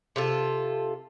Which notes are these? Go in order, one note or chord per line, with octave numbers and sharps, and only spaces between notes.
C3 F4 A4